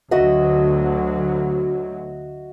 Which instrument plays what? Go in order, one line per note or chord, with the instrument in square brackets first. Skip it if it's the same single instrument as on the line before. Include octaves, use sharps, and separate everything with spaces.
[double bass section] D2 F#3 [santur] F#4 D#5 E5